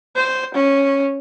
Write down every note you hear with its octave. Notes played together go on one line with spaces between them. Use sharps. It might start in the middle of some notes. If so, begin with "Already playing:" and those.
C5
C#4